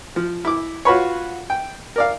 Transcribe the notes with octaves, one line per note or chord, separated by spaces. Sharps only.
F3
E4 D6
F4 F#4 B4 C#5
G5
A#4 D5 F5